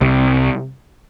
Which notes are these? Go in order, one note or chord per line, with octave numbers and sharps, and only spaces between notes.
C2 C3